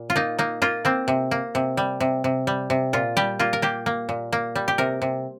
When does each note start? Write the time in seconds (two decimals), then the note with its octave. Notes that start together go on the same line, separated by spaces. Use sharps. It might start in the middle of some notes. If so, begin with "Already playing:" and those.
Already playing: A#2
0.10 F4
0.16 A#3 D#4
0.39 A#3 D#4
0.62 A#3 F4
0.85 A#3 C4
1.08 C3
1.31 A#3
1.55 C3
1.77 G3
2.00 C3
2.24 C3
2.47 G3
2.70 C3
2.93 A#2 F4
3.17 G3 G4
3.39 A#3 F4
3.53 A#4
3.62 A#3 G4
3.86 A#3
4.09 A#2
4.33 A#3
4.56 G3
4.68 G4
4.78 C3 A#4
5.02 C3